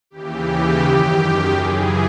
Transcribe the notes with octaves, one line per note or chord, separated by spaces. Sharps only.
D#2 C#3 E3 G4
F#2 D#3 G4
G4
F#2 C#3 E3 G#4